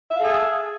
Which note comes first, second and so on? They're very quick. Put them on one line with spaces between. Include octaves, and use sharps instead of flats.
E5 F5 A4 G#4